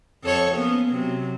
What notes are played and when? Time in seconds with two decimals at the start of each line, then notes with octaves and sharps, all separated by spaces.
0.23 F2 A4 C#5
0.55 A#3 B3 C#4
0.89 C3 F#3